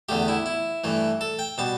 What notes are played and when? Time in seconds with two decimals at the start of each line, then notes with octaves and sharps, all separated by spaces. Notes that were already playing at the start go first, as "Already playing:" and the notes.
0.09 E2 D3 A3 G4
0.28 E4
0.46 E4
0.84 G2 E3 A3
1.21 A4
1.39 G5
1.58 B2 G3 A5